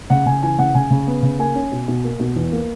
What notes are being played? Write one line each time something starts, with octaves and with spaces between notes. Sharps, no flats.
C#3 F#5
C#3 G#5
E3 G#5
C#3 F#5
C#3 G#5
C#3
B3
C#3
A#3 G#5
C#4
B2
B2
A#3
B2
E2
A#3